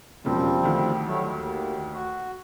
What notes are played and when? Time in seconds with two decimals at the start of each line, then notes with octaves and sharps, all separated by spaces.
0.25 E1 C#3 F3 G3 C4
0.63 D2 D#3
1.07 F#3 G3 A3
1.29 D#2
1.93 F#4